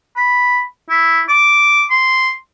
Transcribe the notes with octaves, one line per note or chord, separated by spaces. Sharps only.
B5
E4
D6
C6